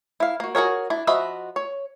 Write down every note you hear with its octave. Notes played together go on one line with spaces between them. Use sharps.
E4 F5
A#3 F#4
F#4 G#4 A#4 C#5
D4 E4
F3 F#4 D#5 E5 B5
C#5